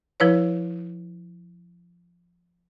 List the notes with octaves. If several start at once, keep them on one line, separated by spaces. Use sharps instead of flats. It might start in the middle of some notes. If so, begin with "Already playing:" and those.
F3 E4 B4 C#5